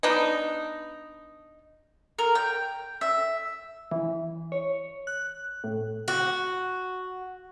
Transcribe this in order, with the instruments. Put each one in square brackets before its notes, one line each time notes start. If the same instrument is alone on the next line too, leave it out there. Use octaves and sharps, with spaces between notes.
[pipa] B3 D4 D#4
[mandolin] A#4
G5
E5
[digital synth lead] E3
C#5
F#6
A2
[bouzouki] F#4